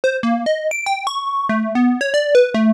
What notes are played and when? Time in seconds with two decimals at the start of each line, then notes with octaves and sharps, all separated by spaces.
0.04 C5
0.23 A#3
0.46 D#5
0.71 D7
0.86 G5
1.07 C#6
1.49 A3
1.75 B3
2.01 C#5
2.14 D5
2.35 B4
2.54 A3